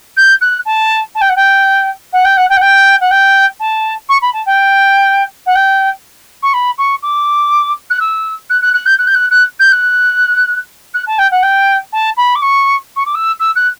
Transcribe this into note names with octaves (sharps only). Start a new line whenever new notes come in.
G6
F#6
A5
A5
G5
F#5
G5
F#5
G5
F#5
G5
F#5
G5
F#5
G5
A5
C#6
B5
A5
G5
F#5
G5
C#6
B5
C#6
D6
F#6
E6
F#6
F#6
F#6
G6
F#6
G6
F#6
F#6
G6
F#6
F#6
A5
G5
F#5
G5
A5
B5
D6
C#6
C#6
D6
E6
E6
F#6